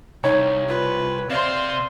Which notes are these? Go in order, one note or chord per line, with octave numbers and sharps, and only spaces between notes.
C2 D#4 C#5
F4 B4
C3 C5 D5 F5 C6